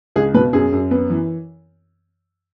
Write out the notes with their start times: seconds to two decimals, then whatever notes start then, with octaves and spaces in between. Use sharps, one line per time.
0.16 C#2 G#4
0.34 B2 B4
0.53 F#2 G#4
0.72 F#2
0.91 B3
1.10 E3